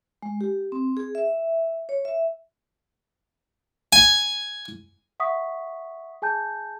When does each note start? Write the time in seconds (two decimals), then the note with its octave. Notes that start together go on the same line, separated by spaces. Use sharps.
0.23 G#3
0.41 G4
0.72 C4
0.97 G#4
1.15 E5
1.89 C#5
2.05 E5
3.93 G#5
5.20 E5 F#5 C#6 D#6 B6
6.22 G#4 G#5 A5 G6